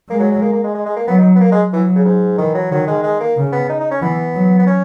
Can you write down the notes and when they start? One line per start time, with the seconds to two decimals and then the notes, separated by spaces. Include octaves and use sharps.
0.09 G#3 A#3
0.20 F#3
0.31 F#3
0.42 A#3
0.53 A#3
0.64 G#3
0.75 G#3
0.86 G#3
0.96 A#3
1.08 F#3 B3
1.18 D#4
1.35 B3
1.41 A#3
1.52 G#3
1.73 E3 F#3
1.95 C#3
2.05 G#2
2.38 D#3 E3
2.54 F#3
2.71 D#3 F#3
2.87 G#3
3.03 G#3
3.20 A#3
3.37 C#3
3.52 B3
3.69 D#4
3.80 D#4
3.91 C#4
4.02 E3 B3
4.35 F#3
4.59 B3
4.67 C#4